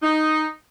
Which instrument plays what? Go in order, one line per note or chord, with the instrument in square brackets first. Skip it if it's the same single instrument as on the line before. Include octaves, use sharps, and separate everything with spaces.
[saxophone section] D#4